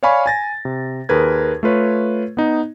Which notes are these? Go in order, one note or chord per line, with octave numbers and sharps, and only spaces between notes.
C#5 D5 F5 G#5 B5 C#6
G#5 A6 A#6
C3
D#2 G#4 A#4 B4 G#6
A3 F4 B4 C#5
B3 D#4